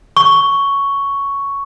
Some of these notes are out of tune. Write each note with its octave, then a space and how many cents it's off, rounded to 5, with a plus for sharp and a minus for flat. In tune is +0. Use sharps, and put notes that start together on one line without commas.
C#6 +5